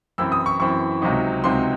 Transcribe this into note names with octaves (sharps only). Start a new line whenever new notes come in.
F#2 E3 C4 E4 E6
D#6
C#6
F#2 E3 C4 E4 C#6
C#2 C3 F#3 C4 D#4
C#2 C3 F#3 C4 D#4 C6